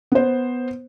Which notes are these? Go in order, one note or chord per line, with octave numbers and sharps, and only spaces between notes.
B3 C5